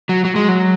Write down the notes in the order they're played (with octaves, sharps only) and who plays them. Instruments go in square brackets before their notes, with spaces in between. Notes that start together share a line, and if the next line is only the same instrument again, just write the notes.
[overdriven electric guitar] F#3
F#3
G#3
F#3